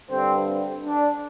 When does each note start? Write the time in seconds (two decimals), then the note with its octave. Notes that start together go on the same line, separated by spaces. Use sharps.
0.10 G2 D3 C4
0.85 D4